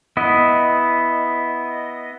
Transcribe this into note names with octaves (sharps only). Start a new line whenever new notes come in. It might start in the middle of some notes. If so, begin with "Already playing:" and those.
B3 E4 D#5